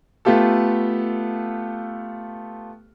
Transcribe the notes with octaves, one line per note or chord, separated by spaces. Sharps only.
A3 B3 F4 G4 A4